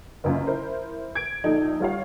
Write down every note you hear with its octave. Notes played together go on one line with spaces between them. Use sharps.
F#1 F#2 F4
E4 A#4 C5
G#6 D7
A#1 D#4 A4
G3 F4 C#5 F5